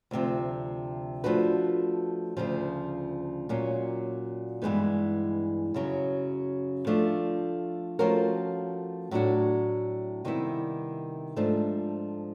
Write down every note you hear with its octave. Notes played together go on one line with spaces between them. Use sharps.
D2 C3 F3
F3 A3 D4 F#4 B4
D2 C#3 F3
A#2 F#3 A#3 C#4
G2 E3 G#3 B3 D#4
F#2 C#3 F#3
F3 A3 D4
F3 A3 C#4 F#4 A#4
A2 F#3 A3 D4 F#4
C3 D#3 G3 B3 E4
G#2 F3 A3 D4